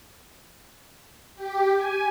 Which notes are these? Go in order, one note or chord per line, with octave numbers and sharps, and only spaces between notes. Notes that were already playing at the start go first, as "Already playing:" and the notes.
G4
G#5